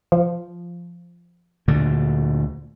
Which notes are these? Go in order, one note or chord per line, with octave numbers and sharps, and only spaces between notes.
F3
D2 A#2 D3